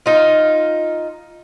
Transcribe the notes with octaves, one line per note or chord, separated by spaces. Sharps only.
D#4 F4